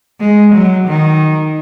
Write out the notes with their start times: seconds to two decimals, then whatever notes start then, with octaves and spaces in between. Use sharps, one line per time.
0.20 G#3
0.53 F#3
0.87 D#3